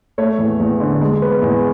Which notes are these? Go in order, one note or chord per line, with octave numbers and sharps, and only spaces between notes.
A3 C#5
E2
E2
D3
G#3
B3
E2